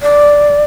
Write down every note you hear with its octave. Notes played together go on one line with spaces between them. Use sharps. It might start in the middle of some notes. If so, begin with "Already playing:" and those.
D5